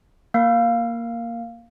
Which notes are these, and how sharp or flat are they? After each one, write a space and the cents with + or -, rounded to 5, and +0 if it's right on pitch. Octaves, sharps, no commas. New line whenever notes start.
A#3 +0 F5 +0